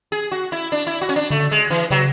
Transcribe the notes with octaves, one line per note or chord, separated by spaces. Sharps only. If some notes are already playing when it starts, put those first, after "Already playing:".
G#4
F#4
E4
D4
E4
F#4
C#4
D4
D3 A3
G#3
E3
C#3 F#3